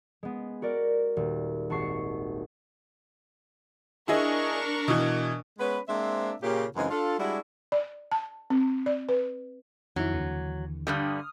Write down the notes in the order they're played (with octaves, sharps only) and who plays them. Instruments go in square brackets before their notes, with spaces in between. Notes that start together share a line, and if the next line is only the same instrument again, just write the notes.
[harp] G#3 B3
F#4 A#4 D5
D#1
G#1 F#4 A5 C#6 C7
[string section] D4 A#4 C#6 [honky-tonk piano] E4 G#4 D#5
[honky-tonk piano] B2 E3
[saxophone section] G#3 B3 C#4 B4
G#3 A#3 C4 D4 C5 E5
A#2 C#3 G4
F#2 C#3 E3 G#3 C4 D#4
D4 F4 A4
G3 G#3 D4 E4 F#4
[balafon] D5
A5
C4
D5
B4
[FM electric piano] F2 D#3 E4 [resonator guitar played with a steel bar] F#3
[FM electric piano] D#2 D3 E3
[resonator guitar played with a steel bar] G2 D3 G3 [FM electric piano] D#6 F6